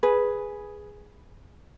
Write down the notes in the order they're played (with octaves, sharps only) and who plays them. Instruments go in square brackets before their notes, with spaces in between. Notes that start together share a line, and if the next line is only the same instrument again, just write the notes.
[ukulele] G#4 B4